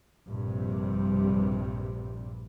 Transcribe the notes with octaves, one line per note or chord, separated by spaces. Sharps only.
A#1 G2 C3 G3